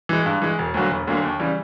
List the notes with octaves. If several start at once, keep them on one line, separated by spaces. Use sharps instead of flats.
E3 G#3
G2
E3 G#3
E1
D2 D3 F#3 A#3
E1
D2 D3 F#3 A#3
D#2
C#3 E3 G3